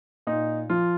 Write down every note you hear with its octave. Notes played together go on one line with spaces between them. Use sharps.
A#2 D#4
F3 F4